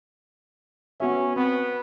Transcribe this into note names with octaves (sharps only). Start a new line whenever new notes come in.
B3 C#4 F#4 E5
B3 C4